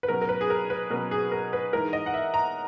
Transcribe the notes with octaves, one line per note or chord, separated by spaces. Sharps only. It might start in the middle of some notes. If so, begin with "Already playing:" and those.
B4
B2 F#3 C#4 A#4
A#4
B4
G#4
A#4
B4
B2 F#3 C#4 A#4
G#4
A#4
B4
E3 G#3 D#4 A#4
D#5
F#5
E5
A#5